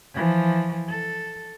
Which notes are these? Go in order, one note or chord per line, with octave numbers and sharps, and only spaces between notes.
E3 F3
A4